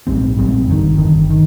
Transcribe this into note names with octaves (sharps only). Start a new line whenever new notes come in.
A#1 G#2 G3 C4
A#1 G#2 G3 C4
G1 G2 D#3
G1 G2 D#3
D#3